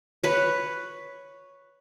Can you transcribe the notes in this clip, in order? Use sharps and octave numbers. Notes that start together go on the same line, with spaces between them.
B4 C#5